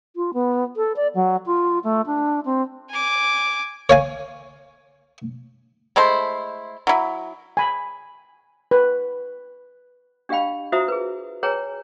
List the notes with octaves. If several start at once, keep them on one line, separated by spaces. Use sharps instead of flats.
F4
B3
A4
D5
F#3
F4
A3
D4
C4
G#5 D6
C#5 F5 G#5
G#3 A3 E4 C5
F#3 E4
G#5 B5
B4
D4 G4 D#5 F5 G5 B5
F4 F#4 C5 E5 A#5 D#6
G#4 B4
G#4 B4 C#5 G5 G#5 A#5